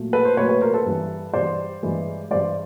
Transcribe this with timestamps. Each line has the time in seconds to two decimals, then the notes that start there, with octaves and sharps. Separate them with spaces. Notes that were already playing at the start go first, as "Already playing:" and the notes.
Already playing: A#2 F#3 A3
0.13 A4 B4
0.25 C5
0.37 A#2 F#3 A3 B4 C#5
0.49 B4 C#5
0.61 A#4 C5
0.74 A4 B4
0.86 G2 E3 G3
1.34 G2 E3 G3 C5 D5
1.83 G2 E3 G#3
2.31 G2 E3 G#3 C5 D5